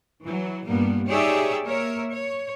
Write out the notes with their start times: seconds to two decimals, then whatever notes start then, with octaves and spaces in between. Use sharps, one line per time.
0.23 E3 F#3
0.66 G2 A#2 G3 A#3 B3
1.08 D#4 G4 G#4 C#5 D5 E5
1.63 A#3 A#4 C#5 E5
2.11 C#5